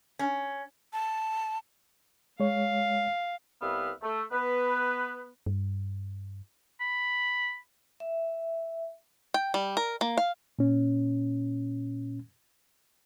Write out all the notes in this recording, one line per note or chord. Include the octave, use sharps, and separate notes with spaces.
C#4
A5
G#3 C#5 F5
C2 G3 B3 B4 E5 F5
A3
B3 B4
G2
B5
E5
G5
G3
A#4
A#3
F5
A#2 C#4